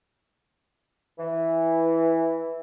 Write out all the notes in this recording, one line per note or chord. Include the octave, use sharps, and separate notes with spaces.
E3